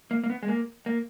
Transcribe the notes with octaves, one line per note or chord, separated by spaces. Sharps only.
A#3
A#3
B3
G#3
A#3
A#3